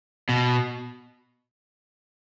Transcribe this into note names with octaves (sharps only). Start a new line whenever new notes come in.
B2